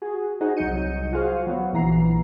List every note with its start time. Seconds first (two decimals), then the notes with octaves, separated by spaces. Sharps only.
0.02 F#4 G#4
0.41 D#4 F#4 G#4 C5 D#5
0.57 C2 F#3 D#5 G6 C#7 D#7
1.12 F4 F#4 G#4 C5 F5
1.47 F#3 B3 F#4
1.73 A#1 E3 A#5 C7